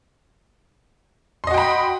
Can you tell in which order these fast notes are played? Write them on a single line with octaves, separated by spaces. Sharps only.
C6 D#5 F#4 G5 B5